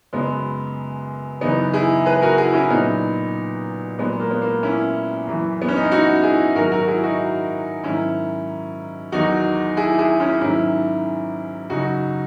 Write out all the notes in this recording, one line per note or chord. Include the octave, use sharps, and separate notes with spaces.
F#2 C#3 F#3 G#3 B3
F#2 C#3 E3 B3 D#4
E4 G#4
G#4 B4
F#4 A#4
E4 G#4
C#4 E4
A#2 F#3 B3 D#4
A#2 F#3 G#3 B3
A#3
B3
A#3
C#4 E4
F#2 E3
B3
C#4
D#4
E4
D#4 F#4
E4 G#4
G#2 D#3 F#3 F#4 A#4
F#4 A#4
E4 G#4
D#4 F#4
G#2 D#3 F#3 C#4 E4
E2 D#3 F#3 D#4 F#4
E4 G#4
E4 G#4
C#4 E4
G#2 D#3 F#3 C#4 E4
F#2 C#3 F#3 D#4 F#4